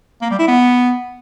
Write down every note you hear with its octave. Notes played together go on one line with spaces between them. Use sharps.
A#3
G3
E4
B3